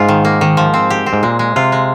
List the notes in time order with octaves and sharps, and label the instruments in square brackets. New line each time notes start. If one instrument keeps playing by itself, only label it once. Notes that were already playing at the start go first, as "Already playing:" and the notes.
Already playing: [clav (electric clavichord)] G#2 [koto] F4
[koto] D#3
A#3
D#3
F3
C4
G4
C4
[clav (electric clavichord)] G#2
[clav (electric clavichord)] A#2 [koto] G#3
[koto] G#3
[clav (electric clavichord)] C3 [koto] F4
[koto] G#3